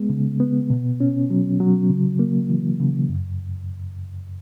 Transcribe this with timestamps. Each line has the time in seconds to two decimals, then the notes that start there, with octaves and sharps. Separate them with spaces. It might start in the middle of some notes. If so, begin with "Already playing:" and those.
Already playing: G#3 B3
0.10 C#3
0.40 B3
0.70 B2
1.00 C#4
1.30 F#3
1.60 F#3
1.90 C#3
2.19 A#3
2.50 E3
2.80 C#3
3.09 F#2